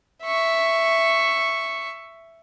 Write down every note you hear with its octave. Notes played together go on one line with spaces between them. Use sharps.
E5 C#6